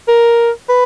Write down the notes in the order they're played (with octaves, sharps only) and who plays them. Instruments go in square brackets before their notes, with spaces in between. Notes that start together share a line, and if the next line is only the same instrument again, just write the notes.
[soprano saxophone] A#4
B4